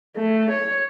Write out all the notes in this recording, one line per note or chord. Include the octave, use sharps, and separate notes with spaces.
A3
C#5